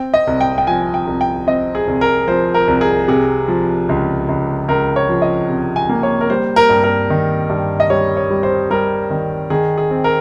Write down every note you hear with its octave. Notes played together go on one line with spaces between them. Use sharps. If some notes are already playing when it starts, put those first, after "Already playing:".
Already playing: C4 G5
D#5
C2
G5
G5
F3 G#5
G5
C2
G5
C4 D#5
G#4
C2
A#4
F3 C5
A#4
C2
G#4
C3 G#4
F3
C#2
C#2
C#2 A#4
C#5
F3
D#5
C3
G#5
A#3
C#5
A#4
G3 C5
A#4
G2
A#4
D#3
G2
D#5
G3 C#5
C#5
G3
C5
G3 A#4
D#3
D#3 G#4
G#4
C4
A#4